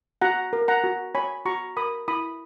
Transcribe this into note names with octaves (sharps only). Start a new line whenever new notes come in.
F#4 F#5 A#5
A#4
F#5 A#5
F#4
C#5 G#5 B5
F#4 A#5 C#6
A#4 B5 D#6
E4 B5 D#6